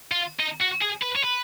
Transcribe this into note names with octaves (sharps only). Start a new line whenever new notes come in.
F4
D#4
F#4
G#4
B4
C#5
B4